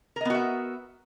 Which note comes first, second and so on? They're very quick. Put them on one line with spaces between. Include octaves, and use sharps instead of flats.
A#4 D#5 B3 F#4 E5